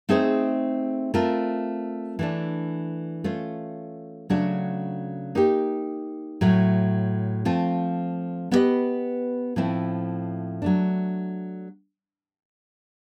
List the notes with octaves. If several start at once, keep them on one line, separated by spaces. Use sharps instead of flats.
A3 C4 D#4 G#4 C5
A3 C4 F4 A#4
E3 A3 D4
A3 C#4 F4
C#3 F#3 A3 D4 F#4
A#3 D#4 G4
A2 F#3 A3
F3 A3 C4 F4
B3 E4 G4 B4 D#5
A2 F3 A3 C4 E4
F#3 A3 D4